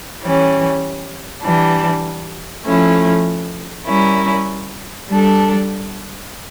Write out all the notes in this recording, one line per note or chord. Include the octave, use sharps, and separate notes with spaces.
E3 G3 C#4
E3 G3 D4
F3 A3 C#4 E4
G3 C#4 E4 A#4
G3 D4 A4